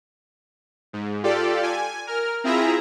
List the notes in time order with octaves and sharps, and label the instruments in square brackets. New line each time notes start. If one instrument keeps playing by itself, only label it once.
[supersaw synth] G#2
F4 G4 A4 D5
G#5
A#4 F6
C4 E4 F4 G#4 E5 A#5